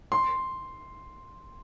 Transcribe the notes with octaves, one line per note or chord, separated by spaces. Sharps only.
C6